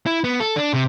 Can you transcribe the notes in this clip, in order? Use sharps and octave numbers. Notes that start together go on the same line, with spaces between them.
E4
B3
A4
D4
C3